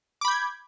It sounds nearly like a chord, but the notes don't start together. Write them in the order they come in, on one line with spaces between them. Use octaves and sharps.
D6 B5 G6 G#6